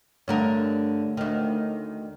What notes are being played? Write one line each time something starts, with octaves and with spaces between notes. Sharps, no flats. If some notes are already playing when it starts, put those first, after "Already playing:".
G2 D3 A3 A#4 C#5
D2 D#3